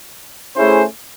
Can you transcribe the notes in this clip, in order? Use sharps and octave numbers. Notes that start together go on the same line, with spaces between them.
A3 C#4 E4 G#4 C5